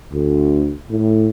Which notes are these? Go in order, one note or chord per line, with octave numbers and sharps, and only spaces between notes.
D2
A2